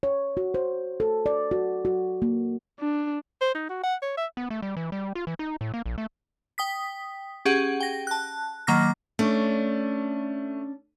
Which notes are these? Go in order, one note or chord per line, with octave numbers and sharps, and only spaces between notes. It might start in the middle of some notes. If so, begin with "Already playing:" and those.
C#5
F#4
C5
A4
D5
F#4
F#4
A#3
D4
C5
D#4
F#4
F#5
C#5
E5
B3
A3
G3
E3
G3
F4
E3
D#4
A2
A#3
A#1
A3
G5 D#6 B6
C#4 G4 G#4 F#5
G5 A#6
A5 F#6
D#3 F#3 A#3 D6 F6 A#6
A3 C#4 D4